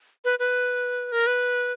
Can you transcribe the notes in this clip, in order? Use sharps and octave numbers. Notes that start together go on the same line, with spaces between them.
B4
B4
A#4
B4